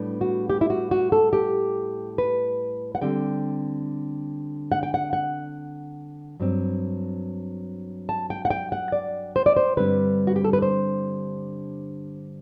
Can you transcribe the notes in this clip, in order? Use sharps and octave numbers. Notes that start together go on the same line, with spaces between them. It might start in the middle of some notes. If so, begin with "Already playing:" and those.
Already playing: A2 G3 B3 D4
F#4
G4
E4
F#4
F#4
A4
G4
B4
F#5
D3 G3 C4 G5
F#5
G5
F#5
F#5
G2 F#3 C4
A5
G5
F#5
G5
F#5
D5
C5
D5
C5
G2 D3 G3 C4 B4
F#4
G4
A4
B4
C5